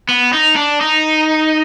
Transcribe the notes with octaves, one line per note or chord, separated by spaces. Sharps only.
B3
D#4
D4
D#4